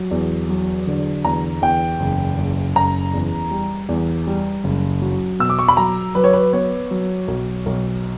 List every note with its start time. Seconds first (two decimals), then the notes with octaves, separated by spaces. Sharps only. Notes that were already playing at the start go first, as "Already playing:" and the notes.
Already playing: F#3
0.11 E2
0.49 F#3
0.87 D3
1.24 E2 A#5
1.62 E2 G5
2.00 F#1
2.38 F#1
2.76 F#1 A#5
3.14 E2
3.51 G3
3.89 E2
4.27 G3
4.64 F#1
5.02 F#3
5.40 B2 E6
5.50 D6
5.59 C#6
5.68 B5
5.77 F#3 A#5
6.15 F#3 B4
6.24 C#5
6.33 B4
6.53 B3 C#5
6.91 F#3
7.28 B1
7.66 B1